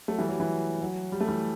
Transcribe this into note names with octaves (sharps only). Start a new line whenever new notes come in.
F#3 A3
E3 G3
F#3
E3
F#3
G3
A3
E3 G3